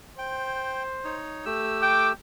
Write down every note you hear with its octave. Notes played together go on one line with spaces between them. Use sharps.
C5 G5
D#4 C#5
A3 G4 E6
G5 D6